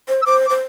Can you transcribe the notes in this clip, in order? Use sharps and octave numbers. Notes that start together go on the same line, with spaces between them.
C5
E6
C5 D6
D6
C5